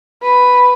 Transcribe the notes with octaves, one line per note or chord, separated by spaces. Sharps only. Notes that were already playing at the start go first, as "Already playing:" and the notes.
B4